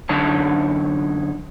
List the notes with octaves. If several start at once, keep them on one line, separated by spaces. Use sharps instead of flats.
F#2 D3 D#4 C#5 A5